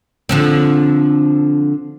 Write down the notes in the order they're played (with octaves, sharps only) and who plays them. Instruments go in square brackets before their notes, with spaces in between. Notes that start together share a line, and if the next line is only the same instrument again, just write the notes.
[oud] D3 F3 C4